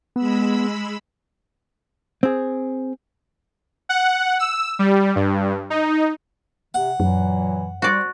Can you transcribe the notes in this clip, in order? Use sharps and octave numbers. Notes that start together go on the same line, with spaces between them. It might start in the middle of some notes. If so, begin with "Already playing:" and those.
G#3 B3 B5 E6
C4 G#4
F#5
E6
G3
G2
D#4
C3 F#5
F#2 A#2 E3 F#3
G3 F#4 C5 D5